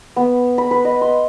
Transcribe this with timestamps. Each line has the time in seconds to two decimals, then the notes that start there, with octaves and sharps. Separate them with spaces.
0.16 B3
0.58 B5
0.71 B4
0.85 D#5
1.01 C6